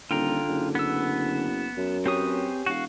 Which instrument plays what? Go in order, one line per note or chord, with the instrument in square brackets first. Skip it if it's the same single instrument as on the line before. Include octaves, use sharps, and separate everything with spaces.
[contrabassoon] D#1 [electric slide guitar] D3 [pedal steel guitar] F4 G5 A#5
[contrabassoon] F#1
[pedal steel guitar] B3 E6
[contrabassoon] F#2
[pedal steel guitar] C4 B4 D#6 [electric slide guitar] G4 G#4 C#5
[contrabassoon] E1 [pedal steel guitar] F#4 F5